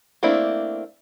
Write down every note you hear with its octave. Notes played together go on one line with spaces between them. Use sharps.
A3 A#3 C4 D4 E4